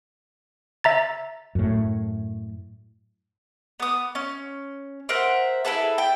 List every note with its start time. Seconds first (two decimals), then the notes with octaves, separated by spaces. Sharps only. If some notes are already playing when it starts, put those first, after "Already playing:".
0.84 E5 A#5 A6
1.55 F#2 A2
3.80 B3 D#6
4.15 C#4
5.09 A#4 C5 E5 F#5
5.65 E4 G#4 A4 B4
5.98 G5